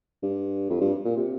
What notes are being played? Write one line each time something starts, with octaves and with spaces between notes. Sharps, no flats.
G2
F2
G2
A#2
C3